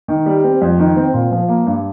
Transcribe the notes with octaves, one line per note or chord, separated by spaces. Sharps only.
D#3
G3
C4
F2
D#3
C4
A#2
F3
A#3
G2